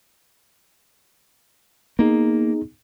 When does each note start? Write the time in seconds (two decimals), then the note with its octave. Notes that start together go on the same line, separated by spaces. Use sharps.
1.99 A#3 B3 D#4 G#4